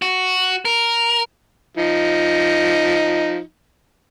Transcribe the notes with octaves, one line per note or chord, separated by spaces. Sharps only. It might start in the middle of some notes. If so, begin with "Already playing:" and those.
F#4
A#4
F3 D#4